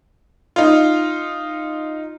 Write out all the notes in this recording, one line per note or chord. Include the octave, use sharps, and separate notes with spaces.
D#4 F4